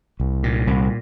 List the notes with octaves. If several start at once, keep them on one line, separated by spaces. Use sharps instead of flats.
C2
A#2
C2